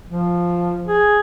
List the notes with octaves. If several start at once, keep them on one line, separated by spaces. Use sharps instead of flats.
F3
G#4